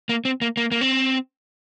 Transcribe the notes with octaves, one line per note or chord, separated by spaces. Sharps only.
A#3
C4
A#3
A#3
A#3
C4